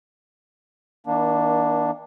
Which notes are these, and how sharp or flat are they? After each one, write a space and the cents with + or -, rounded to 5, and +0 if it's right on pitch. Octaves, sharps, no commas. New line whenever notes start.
D#3 +45 A#3 +35 D4 +0